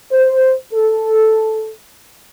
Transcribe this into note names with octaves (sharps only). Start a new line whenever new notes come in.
C5
A4